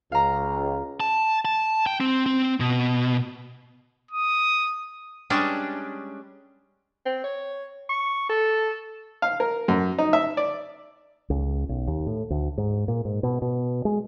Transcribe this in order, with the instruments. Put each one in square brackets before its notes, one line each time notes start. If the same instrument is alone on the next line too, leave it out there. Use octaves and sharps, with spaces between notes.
[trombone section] C#2 [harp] F5 A#5
[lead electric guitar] A5
A5
G5
C4
C4
B2
[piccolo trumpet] D#6
[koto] G3 G#3 C#4 D4
[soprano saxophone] C4
C#5
C#6
A4
[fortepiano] F5
A#4
F#2
D#4
E5
D5
[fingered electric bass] C#2
B1
D#2
A2
D2
G#2
A#2
G#2
B2
B2
G#3